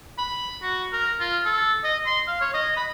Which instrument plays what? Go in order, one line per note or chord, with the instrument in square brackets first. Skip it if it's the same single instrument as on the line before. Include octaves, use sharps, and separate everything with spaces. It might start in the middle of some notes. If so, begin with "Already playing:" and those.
[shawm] B5
F#4
A#4
F4
A4
D#5
C6
F5
C#5
D#5
B5